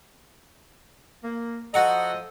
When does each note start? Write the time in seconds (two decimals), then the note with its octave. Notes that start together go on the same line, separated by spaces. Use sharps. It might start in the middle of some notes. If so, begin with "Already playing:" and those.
1.23 A#3
1.74 F3 F#4 A4 D#5 F#5 A#5